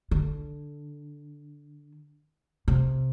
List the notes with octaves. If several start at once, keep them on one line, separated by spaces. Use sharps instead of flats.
D3
C3